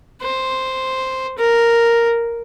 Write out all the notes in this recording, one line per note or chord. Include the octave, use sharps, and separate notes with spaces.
C5
A#4